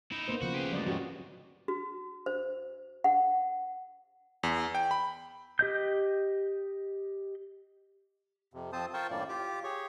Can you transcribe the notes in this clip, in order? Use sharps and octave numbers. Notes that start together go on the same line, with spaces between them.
D#4 E4
A#3 B3 C5
C#3 F3 F#4 B4
G4 G#4
D2 G#2 F#3 D5 D#5
F2 G#2 C#4 F#4 G4
F#4
C5
F#5
E2
G5
B5
G4 D#5 G6
F2 C3
F2 F3 C4 C5 A5 D#6
F4 A#4 C5 G5 A5 C#6
F#2 A2 D#3 A#3 D5
F4 G4 D6
G4 G#4 C#5 C#6